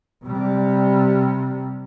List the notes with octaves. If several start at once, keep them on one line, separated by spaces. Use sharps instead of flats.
C3 G3